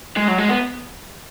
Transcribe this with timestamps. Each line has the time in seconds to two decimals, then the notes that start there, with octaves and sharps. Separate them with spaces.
0.17 G#3
0.28 F#3
0.38 G#3
0.49 B3